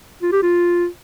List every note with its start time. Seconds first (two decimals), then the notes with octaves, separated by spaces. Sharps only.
0.23 F4
0.32 G4
0.43 F4